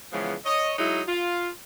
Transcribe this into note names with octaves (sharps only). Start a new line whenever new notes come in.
C#3 E3 F3 G#3 B3
C#5 D#5
F#3 G#3 D#4 E4 F#4
F4